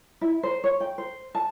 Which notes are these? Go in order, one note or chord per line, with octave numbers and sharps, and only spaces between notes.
E4
C5
C#5
G5
C5
A5